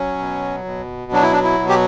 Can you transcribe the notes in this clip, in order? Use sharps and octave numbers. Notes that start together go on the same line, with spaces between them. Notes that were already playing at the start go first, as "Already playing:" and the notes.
Already playing: F#3 C#4
B2
B2
F#3 D4
E4
D4
E4
B2
G4